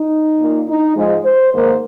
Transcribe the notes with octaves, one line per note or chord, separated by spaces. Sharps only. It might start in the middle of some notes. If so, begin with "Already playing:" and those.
Already playing: D#4
A#2 A#3
D#4
G#2 F3 G#3
C5
G#2 D#3 A#3 C5